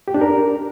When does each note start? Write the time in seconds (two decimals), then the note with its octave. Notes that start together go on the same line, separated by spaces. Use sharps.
0.08 G4
0.14 D4
0.21 A#4